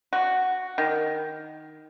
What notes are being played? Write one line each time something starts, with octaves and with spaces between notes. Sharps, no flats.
F#4
D#3